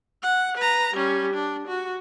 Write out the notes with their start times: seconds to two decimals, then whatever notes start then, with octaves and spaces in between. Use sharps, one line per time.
0.23 F#5
0.57 B4 A#5
0.94 G3 C#4
1.34 D4
1.68 F#4